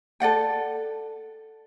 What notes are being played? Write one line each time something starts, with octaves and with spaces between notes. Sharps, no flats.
A4 D5 F#5 G5